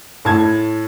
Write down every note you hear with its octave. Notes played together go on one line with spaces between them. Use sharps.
A2 A5 G#6